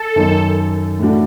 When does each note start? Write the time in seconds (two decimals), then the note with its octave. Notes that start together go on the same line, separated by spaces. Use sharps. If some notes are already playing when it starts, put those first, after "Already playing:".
Already playing: A4
0.16 F#2 D#3 F#3 B3 D#4
0.99 A2 E3 A3 D4 F#4